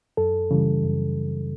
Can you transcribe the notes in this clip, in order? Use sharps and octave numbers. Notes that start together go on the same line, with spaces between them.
F#2 A4
C#3 E3 G3
F#2